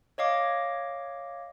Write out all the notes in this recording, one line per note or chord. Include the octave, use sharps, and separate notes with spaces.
C#5 D#5 F5 D6